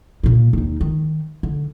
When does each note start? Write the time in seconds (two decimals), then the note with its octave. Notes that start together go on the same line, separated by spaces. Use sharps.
0.23 A#2 A#3
0.53 D#2 D#4
0.81 D#3
1.43 D3